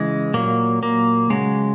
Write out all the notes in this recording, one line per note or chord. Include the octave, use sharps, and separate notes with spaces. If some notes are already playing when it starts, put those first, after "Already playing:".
Already playing: C#3 E3 G#3
A#2 F#3 A#3
A#3
C#3 F#3 G#3